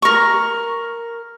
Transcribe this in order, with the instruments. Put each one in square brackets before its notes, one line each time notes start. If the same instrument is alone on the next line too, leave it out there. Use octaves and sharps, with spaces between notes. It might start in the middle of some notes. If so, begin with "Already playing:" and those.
[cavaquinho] A#4 C#6